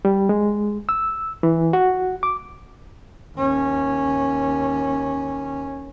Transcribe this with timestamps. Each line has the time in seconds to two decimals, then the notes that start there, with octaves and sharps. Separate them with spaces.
0.05 G3
0.29 G#3
0.89 E6
1.43 E3
1.73 F#4
2.23 D6
3.37 D#2 C#4